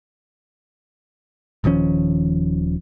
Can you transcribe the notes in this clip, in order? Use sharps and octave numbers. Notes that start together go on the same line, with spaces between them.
D#1 D#3 F3 C#4